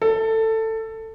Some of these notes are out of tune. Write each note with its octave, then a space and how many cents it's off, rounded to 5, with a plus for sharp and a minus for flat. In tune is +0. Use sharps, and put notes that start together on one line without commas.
A4 +15